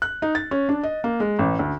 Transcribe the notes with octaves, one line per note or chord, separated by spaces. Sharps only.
F#6
D#4
A6
C#4
D4
D#5
A#3
G#3
A1
D2